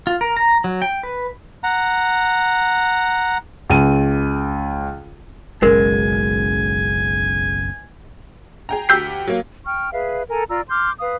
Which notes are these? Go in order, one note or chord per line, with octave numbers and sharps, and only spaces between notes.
F4
A#4
A#5
F#3
G5
B4
F#5 A#5
C#2 D#7
F#1 B1 G#3 C#4 A#4 G#5
G#4 G5 A#5
D2 G4 E6 G6 B6 C7
F#3 A#3
G5 C#6 F6
G#4 B4 E5 F5
A4 A#4 G#5 A#5
F4 D5 A#5 E6
C6 D6 F6 G6
B4 F5 D#6